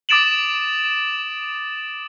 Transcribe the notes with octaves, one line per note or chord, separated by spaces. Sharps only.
D6 D#6 A6 D7 E7 F#7